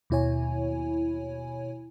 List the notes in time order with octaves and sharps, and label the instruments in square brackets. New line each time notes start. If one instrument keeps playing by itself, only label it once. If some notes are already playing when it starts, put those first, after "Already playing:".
[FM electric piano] D#2 B2 E4 C#5 G#5